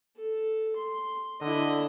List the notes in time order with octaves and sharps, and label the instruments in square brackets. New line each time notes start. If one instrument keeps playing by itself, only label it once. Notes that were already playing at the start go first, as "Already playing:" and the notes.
[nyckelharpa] A4
C6
[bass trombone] D3 [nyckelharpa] E4 D#5